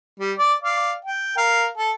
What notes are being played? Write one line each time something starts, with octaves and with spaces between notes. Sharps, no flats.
G3
D5
D5 F5
G5
A#4 F5
A4